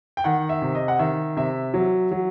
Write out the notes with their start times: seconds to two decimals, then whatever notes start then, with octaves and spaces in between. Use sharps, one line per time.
0.17 G5
0.24 D#3 F#5
0.49 E5
0.62 C3
0.75 D#5
0.88 F#5
0.99 D#3 E5
1.37 C3 E5
1.74 F#3
2.11 F#3